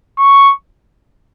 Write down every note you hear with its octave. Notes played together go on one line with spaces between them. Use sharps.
C#6